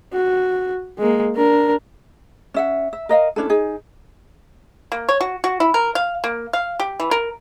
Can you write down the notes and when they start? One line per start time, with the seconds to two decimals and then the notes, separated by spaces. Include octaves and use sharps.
0.13 F#4
0.98 G#3 A#3
1.36 D4 A#4
2.54 C#4 E5 F#5
2.93 E5
3.09 A#4 D#5 F5
3.36 C#4 D4 E4 A4
3.49 D#4 G#4 G#5
4.92 A#3
5.09 C#5
5.21 F#4
5.44 F#4
5.60 E4
5.74 A#4
5.95 F5
6.24 A#3
6.53 F5
6.80 G4
7.00 E3
7.11 A#4